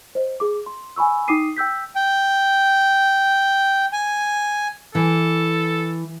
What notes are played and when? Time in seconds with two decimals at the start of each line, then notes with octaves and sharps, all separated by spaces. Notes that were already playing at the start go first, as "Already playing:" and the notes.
0.15 C5 D#5
0.40 G#4 D6
0.66 C6
0.96 G#5 B5 C#6 E6
1.28 D#4 G5 D6 D#6 C7 D#7
1.57 G5 E6 G6 B6
1.96 G5
3.92 G#5
4.95 E3 A4